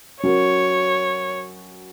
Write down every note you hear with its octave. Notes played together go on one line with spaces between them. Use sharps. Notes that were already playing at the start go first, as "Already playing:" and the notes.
F#3 C#4 F#4 A#4 C#5